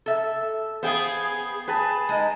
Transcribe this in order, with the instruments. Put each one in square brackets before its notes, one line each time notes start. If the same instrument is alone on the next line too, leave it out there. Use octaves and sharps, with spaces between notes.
[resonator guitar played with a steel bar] A4 E5
[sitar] B3 G#4 [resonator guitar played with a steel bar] C5 F5 G5
[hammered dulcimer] G#4 A5 [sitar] B4
[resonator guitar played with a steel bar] G#3 D#4 D#5